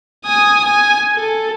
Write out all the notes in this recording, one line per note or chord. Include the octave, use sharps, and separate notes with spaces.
G#5 D#6
G#5
A4